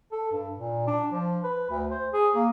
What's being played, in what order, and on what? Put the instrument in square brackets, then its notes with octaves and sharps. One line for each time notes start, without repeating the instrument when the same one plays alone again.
[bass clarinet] A4
G2
A#2
D4
F3
B4
D2
C5
G#4
A#3